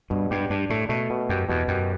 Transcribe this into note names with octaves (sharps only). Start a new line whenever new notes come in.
G2 B2
G2 G4
G2 D4
A2 A3
B2 A3
B2
F#2 G4
E2 B2
F#2 G4